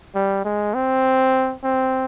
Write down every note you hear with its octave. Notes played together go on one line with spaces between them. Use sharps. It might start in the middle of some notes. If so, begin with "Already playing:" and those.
G3
G#3
C4
C4